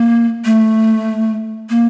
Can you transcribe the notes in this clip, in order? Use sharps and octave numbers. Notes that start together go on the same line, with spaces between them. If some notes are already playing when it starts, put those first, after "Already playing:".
Already playing: A#3
A3
A#3